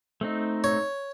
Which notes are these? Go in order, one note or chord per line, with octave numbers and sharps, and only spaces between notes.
A3 C4 D#4
C#5